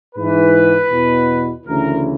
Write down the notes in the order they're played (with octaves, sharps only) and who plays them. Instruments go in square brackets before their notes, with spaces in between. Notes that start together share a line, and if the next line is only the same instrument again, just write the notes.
[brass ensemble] G#2 E3 B4
E2 B2
D2 C#3 E3 A#4